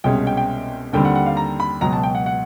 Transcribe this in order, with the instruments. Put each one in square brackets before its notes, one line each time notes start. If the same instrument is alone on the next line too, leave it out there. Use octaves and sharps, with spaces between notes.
[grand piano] C2 B2 G#3 C#4 G5
G5
G5
D#2 D3 G3 C4 G5
F#5
F#5
F5
A#5
B5
C#2 B2 F#3 A#5
A5
G5
F#5
F#5